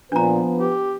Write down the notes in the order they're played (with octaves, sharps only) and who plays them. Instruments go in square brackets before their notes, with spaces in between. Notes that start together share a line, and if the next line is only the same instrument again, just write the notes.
[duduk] A#2 [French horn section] F3 B3 B4 [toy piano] D4 A#5
[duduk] G4